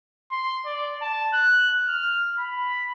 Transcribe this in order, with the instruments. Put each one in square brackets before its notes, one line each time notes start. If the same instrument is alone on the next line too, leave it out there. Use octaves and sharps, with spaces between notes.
[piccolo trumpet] C6
D5
A5
F#6
F6
B5